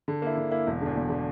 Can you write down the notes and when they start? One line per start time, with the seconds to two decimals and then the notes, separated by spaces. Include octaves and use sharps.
0.08 D3
0.22 A#3 E4
0.37 D3
0.52 A#3 E4
0.67 E1
0.82 E2 D3
0.96 E1
1.10 D3